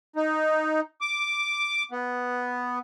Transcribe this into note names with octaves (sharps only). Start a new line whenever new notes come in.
D#4
D6
B3